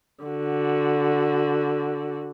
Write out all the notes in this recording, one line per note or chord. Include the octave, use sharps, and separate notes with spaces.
D3 F#4